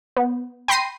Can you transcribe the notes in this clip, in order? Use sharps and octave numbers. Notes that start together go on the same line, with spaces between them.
B3
G5 B5 C6 A#6 C7 D#7